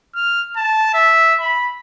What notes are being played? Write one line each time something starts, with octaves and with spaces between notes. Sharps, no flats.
F6
A5
E5
B5